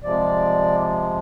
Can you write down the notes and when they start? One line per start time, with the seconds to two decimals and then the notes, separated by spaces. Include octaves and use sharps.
0.03 C3 F3 G#3 D5